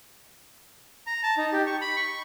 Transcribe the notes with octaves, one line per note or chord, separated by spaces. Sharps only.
A#5
A5
D#4
G4
C#6
B5
C#6